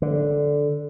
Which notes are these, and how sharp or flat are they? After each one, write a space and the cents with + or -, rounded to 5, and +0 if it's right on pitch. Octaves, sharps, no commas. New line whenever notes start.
D3 -5